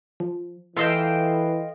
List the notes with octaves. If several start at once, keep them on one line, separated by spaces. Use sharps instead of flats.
F3
E3 F4 A4 D#5 E5 G5 E6 C7